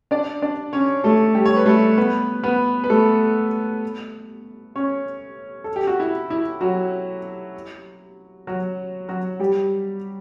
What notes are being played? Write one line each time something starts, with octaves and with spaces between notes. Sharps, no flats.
D4 D5
D4 D5
C#4 C#5
A3 A4
G3 G4
C#5
B4
A3 A4
B3 B4
B3 B4
B4
A3 A4
C#4 C#5
A4
G4
F#4
E4
E4
F#3 F#4
F#3 F#4
F#3 F#4
G3 G4